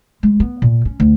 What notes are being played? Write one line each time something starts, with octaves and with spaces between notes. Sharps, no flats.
G#3
B3
A#2
C#4
D2